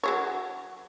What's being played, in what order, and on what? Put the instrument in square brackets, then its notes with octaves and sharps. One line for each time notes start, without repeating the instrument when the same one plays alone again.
[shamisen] F#3 G#4 C#5